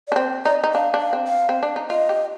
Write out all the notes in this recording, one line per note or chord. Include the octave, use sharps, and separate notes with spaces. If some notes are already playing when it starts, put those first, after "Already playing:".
D5
D4
C4 C5
D#4 D5
D#4
D4 F5
D4
F5
C4
F5
C4
D4
D#4
F4 D#5
G4